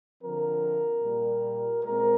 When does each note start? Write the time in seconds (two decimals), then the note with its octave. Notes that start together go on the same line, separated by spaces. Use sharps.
0.22 D3 F3 C4 A#4
1.03 A#2 G3 A#3
1.83 A#2 G#3 C4 A#4